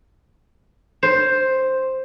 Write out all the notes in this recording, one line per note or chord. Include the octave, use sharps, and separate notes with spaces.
C5